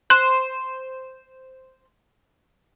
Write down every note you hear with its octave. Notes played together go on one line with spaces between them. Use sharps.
C5 F#6